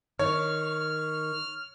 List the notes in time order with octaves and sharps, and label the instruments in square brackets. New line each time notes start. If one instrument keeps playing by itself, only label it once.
[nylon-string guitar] D#3 [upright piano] C#5 [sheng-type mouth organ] F6